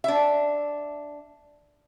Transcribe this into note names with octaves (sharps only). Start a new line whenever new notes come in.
D4 E5